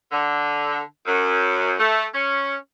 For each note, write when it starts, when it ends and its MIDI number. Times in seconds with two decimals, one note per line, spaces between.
0.12 0.80 50
1.06 1.74 42
1.77 2.04 57
2.14 2.55 61